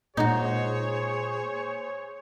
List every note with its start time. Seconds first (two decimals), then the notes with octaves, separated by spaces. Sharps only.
0.17 A#2 G#3 D#4 F#4 G#4 C5 C#5